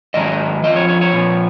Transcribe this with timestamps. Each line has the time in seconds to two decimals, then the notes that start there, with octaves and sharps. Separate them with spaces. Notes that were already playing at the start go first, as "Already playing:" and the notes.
0.14 G#2 D#3 F#3 D#5
0.63 F2 F3 D#5
0.76 C#5
0.88 C#5
1.01 C#5
1.13 A#2 F3